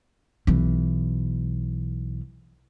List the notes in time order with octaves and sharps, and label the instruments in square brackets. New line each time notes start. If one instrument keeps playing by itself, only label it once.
[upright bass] B1 E3